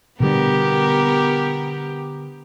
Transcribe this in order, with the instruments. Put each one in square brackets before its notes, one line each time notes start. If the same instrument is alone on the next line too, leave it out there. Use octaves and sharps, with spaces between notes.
[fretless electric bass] B2 D3 G3 [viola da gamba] B3 G4 A#4